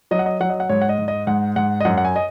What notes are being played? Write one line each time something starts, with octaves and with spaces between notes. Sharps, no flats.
F#3 D#5
F#5
D#5
F#3 F#5
D#5
F#5
G#2 C#5
F#5
D#5
G#2
D#5
G#2 F#5
G#2 F#5
D#5
F#2 F#5
F#5
G#5
D#5